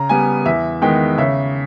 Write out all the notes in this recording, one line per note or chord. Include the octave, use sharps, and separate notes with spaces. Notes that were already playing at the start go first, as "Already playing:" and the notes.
Already playing: C#3 A#5
G3 B3 G#5
E2 E5
D#3 G#3 B3 G5
C#3 E5